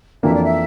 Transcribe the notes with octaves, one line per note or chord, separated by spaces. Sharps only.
F2 E3 A#3 D4 E5
D5
E5